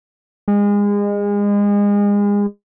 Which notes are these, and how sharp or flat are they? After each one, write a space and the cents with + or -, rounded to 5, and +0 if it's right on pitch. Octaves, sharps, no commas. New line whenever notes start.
G#3 -30